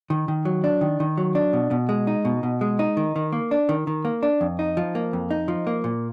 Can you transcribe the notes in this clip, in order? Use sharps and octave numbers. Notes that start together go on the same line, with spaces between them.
D#3
D#3
F#3
D4
D#3
D#3
F#3
D4
B2
B2
G#3
D#4
B2
B2
G#3
D#4
D#3
D#3
A#3
D4
D#3
D#3
A#3
D4
F2
D#4
F3
A#3
F2
D#4
F3
A#3
A#2